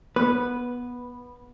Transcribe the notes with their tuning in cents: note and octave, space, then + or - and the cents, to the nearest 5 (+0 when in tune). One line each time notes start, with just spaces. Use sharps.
B3 -15 B4 +0